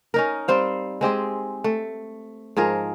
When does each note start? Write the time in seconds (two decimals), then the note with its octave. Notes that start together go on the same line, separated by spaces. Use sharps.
0.14 C#4 D#4 A#4
0.48 G3 C4 C5 F5
1.01 G#3 C4 G4 G#4
1.64 A3
2.57 G#2 F3 G#4 A#4